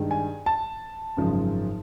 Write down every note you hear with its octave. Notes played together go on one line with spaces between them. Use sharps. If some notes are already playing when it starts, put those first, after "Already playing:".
Already playing: G2 D#3 G#3
G#5
A5
G#1 F#2 C#3 F3 G#3